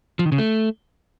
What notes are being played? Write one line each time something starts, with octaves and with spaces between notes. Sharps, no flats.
F3
D#3
C#3
A3